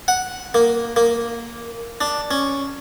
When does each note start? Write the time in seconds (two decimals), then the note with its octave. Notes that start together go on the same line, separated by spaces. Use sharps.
0.08 F#5
0.54 A#3
0.96 A#3
2.01 D4
2.31 C#4